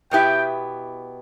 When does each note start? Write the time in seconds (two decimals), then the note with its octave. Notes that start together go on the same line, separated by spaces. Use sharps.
0.11 B2 B3 E4 G4 G5